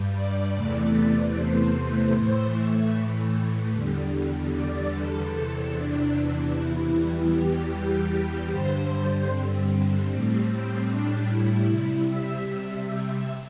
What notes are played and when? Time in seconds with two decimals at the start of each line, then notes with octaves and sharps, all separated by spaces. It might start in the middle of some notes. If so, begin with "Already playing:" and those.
Already playing: G2 G3
0.15 D5
0.54 E2 C3 E3 A3
0.95 D5
1.35 C5
2.14 A2 E3 A3 C5
2.53 E5
3.72 E2 D3 G3
4.53 D5
4.92 A4
5.32 E2 C3 E3
5.71 D4
6.51 E4
6.91 E2 E3 G3
7.31 G4
7.71 G4
8.50 G2 D3 G3 C5
9.30 C4
10.08 A2 G3
10.87 D4
11.28 E4
11.67 C3 G3
12.08 E5